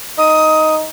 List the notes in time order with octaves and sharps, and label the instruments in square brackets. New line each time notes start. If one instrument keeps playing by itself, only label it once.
[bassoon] D#4 [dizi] D#6